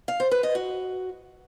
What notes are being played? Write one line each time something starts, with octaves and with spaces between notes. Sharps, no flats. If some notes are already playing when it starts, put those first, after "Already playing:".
F5
C5
B4
D#5
F#4